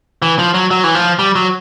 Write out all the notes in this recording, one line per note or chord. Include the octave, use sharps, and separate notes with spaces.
E3
F3
F#3
F#3
E3
F3
G3
F#3